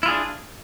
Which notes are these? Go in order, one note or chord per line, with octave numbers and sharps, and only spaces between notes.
D4 E4 F4 G#4